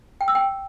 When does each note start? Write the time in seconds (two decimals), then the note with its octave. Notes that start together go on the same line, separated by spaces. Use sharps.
0.21 G5
0.28 E6
0.35 G5